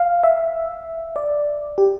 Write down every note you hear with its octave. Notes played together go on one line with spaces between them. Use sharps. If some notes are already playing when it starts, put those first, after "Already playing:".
Already playing: F5
E5
D5
G4